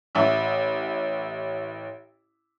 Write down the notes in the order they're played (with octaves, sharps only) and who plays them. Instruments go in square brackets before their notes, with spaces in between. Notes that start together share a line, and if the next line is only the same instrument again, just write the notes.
[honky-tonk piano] A1 E5